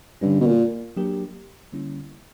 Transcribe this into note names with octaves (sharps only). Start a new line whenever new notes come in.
G2 D3 G3 C#4
B2
A#2
F#3 A#3 D4 G4 A#4
D3 G3 A#3 C#4 E4